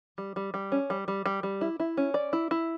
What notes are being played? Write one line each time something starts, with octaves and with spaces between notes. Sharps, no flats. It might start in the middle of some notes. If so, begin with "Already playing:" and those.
G3
G3
G3
C#4
G3
G3
G3
G3
E4
E4
C#4
D5
E4
E4